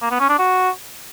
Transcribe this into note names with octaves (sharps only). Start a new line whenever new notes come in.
A#3
B3
C#4
D4
F#4